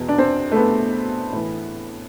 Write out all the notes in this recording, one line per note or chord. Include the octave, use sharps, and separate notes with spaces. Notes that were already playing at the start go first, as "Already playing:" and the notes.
Already playing: E2 B2
D4
C4
A3
B3
A2 E3